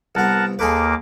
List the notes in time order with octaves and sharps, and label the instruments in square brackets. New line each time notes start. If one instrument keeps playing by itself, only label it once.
[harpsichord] C2 B3 [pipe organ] A#4 F#5 A5
[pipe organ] D#2 A#3 D6 [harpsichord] G#4 A4 B4